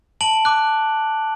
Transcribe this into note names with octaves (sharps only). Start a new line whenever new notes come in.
A5 D7 F#7
D6 F#6